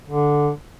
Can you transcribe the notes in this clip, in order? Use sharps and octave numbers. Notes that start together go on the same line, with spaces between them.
D3